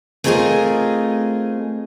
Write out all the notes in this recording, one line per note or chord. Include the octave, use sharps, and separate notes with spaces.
A3 C4 D#4 F4 G#4 A#4